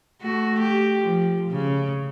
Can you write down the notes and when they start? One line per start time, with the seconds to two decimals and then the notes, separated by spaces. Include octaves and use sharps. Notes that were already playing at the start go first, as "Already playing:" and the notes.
0.21 A3 F#4
0.60 G4
1.01 F3
1.50 C#3